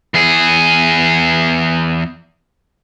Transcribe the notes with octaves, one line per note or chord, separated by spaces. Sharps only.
E2 G#4